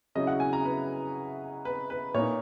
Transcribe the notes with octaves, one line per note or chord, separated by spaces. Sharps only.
C#3 F#3 C#4 E4 D#5
F#5
G#5
A#5
B4
B4
B4
A#2 A#3 D#4 C#5